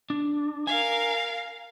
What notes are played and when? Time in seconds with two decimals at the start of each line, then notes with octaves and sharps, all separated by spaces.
0.10 D4
0.67 A#4 F5 G#5